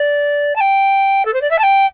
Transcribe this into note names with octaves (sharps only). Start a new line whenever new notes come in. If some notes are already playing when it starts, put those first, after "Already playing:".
Already playing: D5
A5
G5
A4
C5
D5
E5
A5
G5